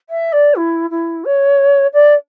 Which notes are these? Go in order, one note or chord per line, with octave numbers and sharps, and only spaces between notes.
E5
D5
E4
E4
C#5
D5